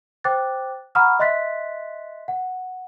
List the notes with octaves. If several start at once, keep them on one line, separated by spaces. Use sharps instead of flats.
C5 G5 D6 F#6 A6
F#5 A#5 B5 C#6 D#6 F6
D#5 E5 C6 F#6 A6 B6
F#5